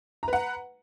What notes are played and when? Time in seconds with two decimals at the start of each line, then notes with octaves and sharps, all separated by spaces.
0.23 A#5
0.28 B4
0.33 F#5